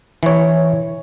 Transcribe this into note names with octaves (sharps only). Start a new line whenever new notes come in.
E3 C#5